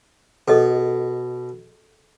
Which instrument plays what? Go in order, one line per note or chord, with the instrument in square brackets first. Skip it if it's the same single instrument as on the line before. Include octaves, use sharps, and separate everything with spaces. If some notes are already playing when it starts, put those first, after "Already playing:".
[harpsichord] B2 [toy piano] G#4 A4 D#5